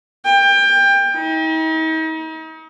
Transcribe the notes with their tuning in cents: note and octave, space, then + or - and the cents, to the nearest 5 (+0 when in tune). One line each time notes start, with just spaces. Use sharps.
G5 +25
D#4 +40